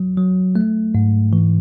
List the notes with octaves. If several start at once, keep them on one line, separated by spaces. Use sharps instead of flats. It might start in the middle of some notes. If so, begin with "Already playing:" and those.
Already playing: F#3
F#3
A3
G#2
E3